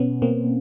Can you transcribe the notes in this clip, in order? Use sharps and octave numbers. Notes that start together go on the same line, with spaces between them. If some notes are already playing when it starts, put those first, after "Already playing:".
Already playing: B2 B3 C#4
B2 A#3 C4